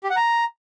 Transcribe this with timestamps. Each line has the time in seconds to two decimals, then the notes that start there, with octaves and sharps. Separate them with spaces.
0.04 G4
0.10 F#5
0.16 A#5